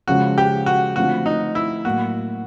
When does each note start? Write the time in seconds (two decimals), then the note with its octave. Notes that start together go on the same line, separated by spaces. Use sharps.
0.08 C#3 F3 G#3 C#4 F#4
0.38 G4
0.66 F#4
0.96 D3 F3 A3 C4 F4 F#4
1.26 D#4
1.55 E4
1.85 A2 F#3 A#3 F#4